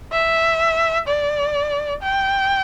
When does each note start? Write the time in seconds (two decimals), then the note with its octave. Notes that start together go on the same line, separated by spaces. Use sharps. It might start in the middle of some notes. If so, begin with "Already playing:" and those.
0.12 E5
1.08 D5
2.03 G5